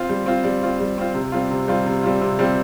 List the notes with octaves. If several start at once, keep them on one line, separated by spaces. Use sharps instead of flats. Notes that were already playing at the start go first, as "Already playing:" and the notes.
Already playing: C4 F4
G3
C4 F4
G3
C4 F4
G3
C4 F4
C3
G3 C4 F4
C3
G3 C4 F4
C3
G3 C4 F4
C3
G3 C4 F4